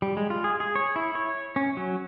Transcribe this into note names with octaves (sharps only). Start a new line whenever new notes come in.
G3
G#3
F4
G#4
G#4
C#5
E4
C#5
C#4
F#3